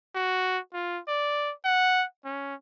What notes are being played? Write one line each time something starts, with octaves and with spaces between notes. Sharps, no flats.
F#4
F4
D5
F#5
C#4